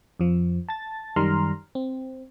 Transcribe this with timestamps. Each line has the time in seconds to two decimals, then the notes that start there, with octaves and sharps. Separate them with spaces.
0.20 F2 F3
0.69 A5 A6
1.16 F#2 D#3 G3 A#5 C6 F6
1.75 C4